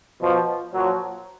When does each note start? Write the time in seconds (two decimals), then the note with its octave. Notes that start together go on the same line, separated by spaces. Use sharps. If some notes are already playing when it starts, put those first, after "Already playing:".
0.21 B2 F3
0.73 A#2 F3 F#3